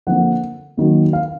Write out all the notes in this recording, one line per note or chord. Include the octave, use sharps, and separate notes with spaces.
D3 F3 A#3 F#5
D#3 F#3 A#3
F5